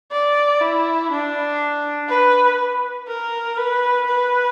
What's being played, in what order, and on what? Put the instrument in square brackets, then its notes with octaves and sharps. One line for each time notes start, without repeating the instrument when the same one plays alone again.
[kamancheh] D5
E4
D4
B4
A#4
B4
B4